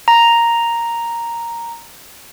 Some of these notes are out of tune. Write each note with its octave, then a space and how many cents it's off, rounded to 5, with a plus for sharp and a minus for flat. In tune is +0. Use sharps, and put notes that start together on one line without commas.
A#5 +0